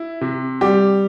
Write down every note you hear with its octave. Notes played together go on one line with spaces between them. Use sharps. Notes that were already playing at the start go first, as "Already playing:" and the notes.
Already playing: E4
C3
G3 G4